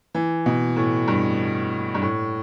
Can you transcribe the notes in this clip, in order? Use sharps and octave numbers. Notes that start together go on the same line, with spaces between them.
E3
B2
A2
G2
G2
A2